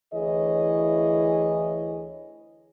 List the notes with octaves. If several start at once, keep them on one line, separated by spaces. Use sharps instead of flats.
D2 E3 E4 G#4 C#5 D#5